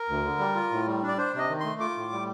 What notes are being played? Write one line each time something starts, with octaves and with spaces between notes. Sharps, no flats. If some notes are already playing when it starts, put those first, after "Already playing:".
Already playing: A#4
D2
D3
G3
F4
A2
G3
D4
D5
D4 C5
C3 D#5
D#3
A3 C6
F4 D6
A2
G3